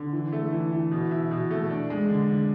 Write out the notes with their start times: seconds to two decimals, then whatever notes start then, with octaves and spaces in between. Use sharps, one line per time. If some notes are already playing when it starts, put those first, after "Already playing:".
Already playing: D3
0.13 E3
0.33 A3
0.52 E3
0.72 E3
0.91 B2
1.11 E4
1.31 B2
1.51 A3
1.70 D4
1.90 G#3
2.10 D3
2.30 D3